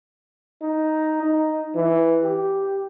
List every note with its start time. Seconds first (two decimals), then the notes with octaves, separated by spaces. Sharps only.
0.62 D#4
1.23 D#4
1.75 E3
2.23 G4